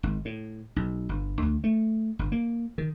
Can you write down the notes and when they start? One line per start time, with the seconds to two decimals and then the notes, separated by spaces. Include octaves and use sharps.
0.03 G#1
0.25 A2
0.76 B1
1.09 G1
1.42 D2
1.64 A3
2.19 G1
2.32 A#3
2.78 D#3